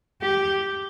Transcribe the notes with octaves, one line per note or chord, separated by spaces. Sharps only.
G4